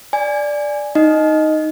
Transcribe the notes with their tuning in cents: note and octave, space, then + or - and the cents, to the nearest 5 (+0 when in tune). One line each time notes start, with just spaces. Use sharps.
D5 +0 G#5 +0
D#4 +5 D#5 +0